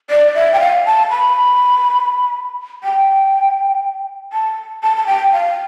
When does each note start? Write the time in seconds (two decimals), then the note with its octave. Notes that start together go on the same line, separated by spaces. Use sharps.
0.10 D5
0.35 E5
0.53 G5
0.60 F5
0.85 A5
1.10 B5
2.84 G5
4.33 A5
4.83 A5
4.96 A5
5.06 G5
5.32 F5